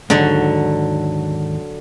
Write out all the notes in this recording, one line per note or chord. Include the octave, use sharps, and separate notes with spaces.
D#2 G#2 D3 F#3